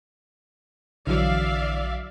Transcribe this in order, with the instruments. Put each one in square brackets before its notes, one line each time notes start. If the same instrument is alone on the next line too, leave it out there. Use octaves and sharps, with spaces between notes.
[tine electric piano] A#1 [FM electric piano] D3 E3 F#3 [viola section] D5 E5 F5